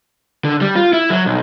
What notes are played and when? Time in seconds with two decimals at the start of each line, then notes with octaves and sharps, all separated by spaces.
0.45 D3
0.61 G3
0.76 F4
0.93 E4
1.10 F#3
1.26 B1